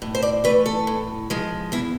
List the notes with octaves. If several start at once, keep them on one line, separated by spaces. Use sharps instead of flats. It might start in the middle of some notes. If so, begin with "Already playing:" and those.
A2
C5
D5
E3 A3 B4
A4
A2
F3 G#3
E2 E4